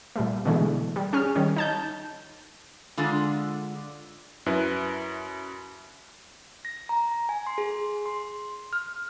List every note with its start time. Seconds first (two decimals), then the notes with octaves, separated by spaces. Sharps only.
0.16 A#2 G3 A3
0.45 B2 D3 E3 G#3 A3
0.96 G3
1.13 C#4 G#4 F6
1.36 D#3 G3 C#4
1.56 D#4 A5 G6
2.97 D3 G#3 F4 A4
4.46 F#2 E4 B4
6.65 A#6
6.89 A#5
7.29 G#5
7.47 C6
7.58 G#4
8.06 C6
8.73 F6